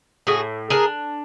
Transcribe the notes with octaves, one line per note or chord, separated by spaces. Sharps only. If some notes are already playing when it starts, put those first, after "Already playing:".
A2 F#4 G#4
D4 G#4 A#4